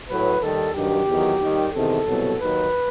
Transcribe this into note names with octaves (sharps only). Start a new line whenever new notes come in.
A2 F#3 B4
D#2 D#3 G3 A4
G2 D#3 F#3 G4
E2 D#3 F#3
D#2 D#3 G3
E2 C3 D#3 A4
C2 B2 F#3
D#2 D#3 F#3 B4